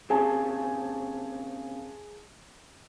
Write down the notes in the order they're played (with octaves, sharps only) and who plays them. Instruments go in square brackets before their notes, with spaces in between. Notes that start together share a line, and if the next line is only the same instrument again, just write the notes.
[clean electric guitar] A#2 C#3 C4 [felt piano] G#4 G#5 A5